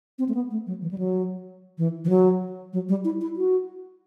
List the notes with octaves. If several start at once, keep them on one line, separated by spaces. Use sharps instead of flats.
C4
A3
B3
A3
F#3
E3
G3
F#3
E3
E3
F#3
F#3
G3
E4
E4
F#4